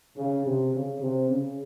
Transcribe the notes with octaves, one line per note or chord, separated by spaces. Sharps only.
C#3
C3
C#3
C3
C#3